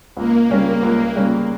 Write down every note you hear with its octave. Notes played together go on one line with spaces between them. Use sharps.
C#2 A#3
C#3 G3 C#4
C#2
C#3 G3 C#4